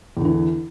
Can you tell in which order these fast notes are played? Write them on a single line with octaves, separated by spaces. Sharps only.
E2 D3 E3